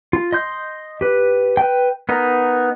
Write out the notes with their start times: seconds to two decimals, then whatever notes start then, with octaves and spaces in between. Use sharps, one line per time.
0.13 F4
0.32 D#5 C6 G6
1.01 G4 B4
1.57 B4 G5
2.09 B3 D#4 A#4